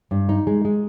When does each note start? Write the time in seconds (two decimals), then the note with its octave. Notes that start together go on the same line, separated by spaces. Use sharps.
0.11 G2
0.29 D#4
0.47 G#3
0.65 G#3